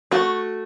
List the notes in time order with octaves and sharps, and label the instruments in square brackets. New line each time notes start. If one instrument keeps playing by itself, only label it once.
[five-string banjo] A3 F#4